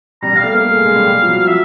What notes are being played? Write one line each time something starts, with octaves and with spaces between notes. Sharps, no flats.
G3 A#5
G3 F5
A3
A#3 F5
A3
G#3
G#3
G3
G3
F3
F#3
F3 E5